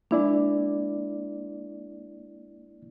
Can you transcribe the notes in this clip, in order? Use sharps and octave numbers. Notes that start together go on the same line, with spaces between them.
G#3 A#3 D4 E4 D5